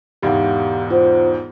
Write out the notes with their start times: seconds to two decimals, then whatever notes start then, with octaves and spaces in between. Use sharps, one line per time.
0.22 E1 G#2 E3 G4 F5 F#5
0.90 F4 C5 F#5